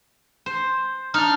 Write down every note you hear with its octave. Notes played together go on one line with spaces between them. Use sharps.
C5
D4 D#4 F6